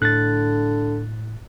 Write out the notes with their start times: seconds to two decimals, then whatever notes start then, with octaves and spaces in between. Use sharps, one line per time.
0.02 A2 D3 F#6 A6